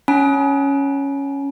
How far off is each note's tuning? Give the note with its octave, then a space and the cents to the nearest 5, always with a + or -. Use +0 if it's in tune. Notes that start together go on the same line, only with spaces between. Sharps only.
C#4 +0 G#5 +35 B5 -45